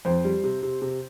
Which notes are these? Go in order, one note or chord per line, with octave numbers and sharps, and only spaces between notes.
F2 C5
G3
C3
C3
C3